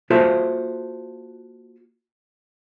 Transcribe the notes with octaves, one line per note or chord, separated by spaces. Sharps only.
A#3 F4 F#4 A4 C5 E5